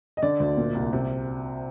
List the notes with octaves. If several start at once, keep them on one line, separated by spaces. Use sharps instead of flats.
D#5
D3 D5
D2
A#2
C2
C3